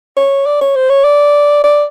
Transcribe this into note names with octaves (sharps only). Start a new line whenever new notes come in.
C#5
D5
C#5
C5
C#5
D5
D5